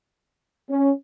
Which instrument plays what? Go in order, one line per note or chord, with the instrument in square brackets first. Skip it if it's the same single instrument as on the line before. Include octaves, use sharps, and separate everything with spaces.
[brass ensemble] C#4